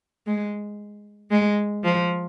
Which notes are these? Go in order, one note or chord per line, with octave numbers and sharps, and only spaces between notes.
G#3
G#3
F3